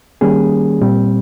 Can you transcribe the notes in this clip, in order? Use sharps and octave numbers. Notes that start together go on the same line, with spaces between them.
D#3 G3 A#3 C#4 G#4
A#2 G3 C4